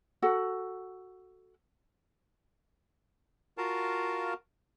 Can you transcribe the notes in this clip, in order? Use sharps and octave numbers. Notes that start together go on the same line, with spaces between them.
F#4 A4 F#5
F4 F#4 A#4 F5 A5